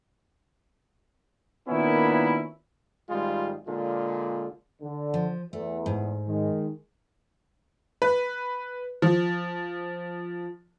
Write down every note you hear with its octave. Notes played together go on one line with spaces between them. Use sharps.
A#2 D#3 A#3 B3 C#4 E4
G#1 G3 G#3 F4
A#2 D3 G#3 F4
D3
F3
E2 A3
G#2
D#3 G#3
B4
F3